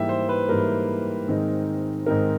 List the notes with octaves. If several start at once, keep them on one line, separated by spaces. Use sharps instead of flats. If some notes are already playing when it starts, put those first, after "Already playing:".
Already playing: G#2 E3 G3 A#3 E5 G5
C5
B4
G#2 E3 G3 A#3 A#4
G#2 D#3 G#3 C4 D#4
G#2 D#3 G#3 C4 D#4 A#4